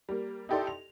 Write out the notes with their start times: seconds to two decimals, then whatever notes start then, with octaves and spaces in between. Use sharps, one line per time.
0.09 G3 A#3
0.49 D#4 E4 G4 A4 D5 C6
0.67 F7